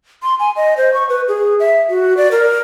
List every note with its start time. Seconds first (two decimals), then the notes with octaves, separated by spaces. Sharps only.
0.23 C6
0.40 G#5
0.56 D#5
0.77 C5
0.94 C#6
1.09 B4
1.28 G#4
1.60 E5
1.89 F#4
2.17 D5
2.32 A#4